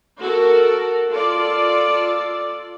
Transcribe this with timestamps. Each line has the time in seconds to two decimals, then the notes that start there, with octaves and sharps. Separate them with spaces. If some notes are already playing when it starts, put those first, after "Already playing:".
0.20 F#4 A4 A#4
1.12 F4 A4 D5